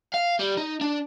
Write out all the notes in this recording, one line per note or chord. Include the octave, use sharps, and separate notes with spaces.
F5
G3
D#4
D4